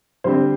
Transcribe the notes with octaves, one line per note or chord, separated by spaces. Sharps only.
D3 G3 C4 C5